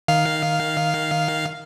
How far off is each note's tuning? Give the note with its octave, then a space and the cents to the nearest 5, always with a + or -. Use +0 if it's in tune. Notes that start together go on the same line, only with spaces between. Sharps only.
D#3 +0 F5 +0